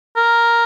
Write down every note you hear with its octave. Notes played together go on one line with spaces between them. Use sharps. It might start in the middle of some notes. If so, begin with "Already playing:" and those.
A#4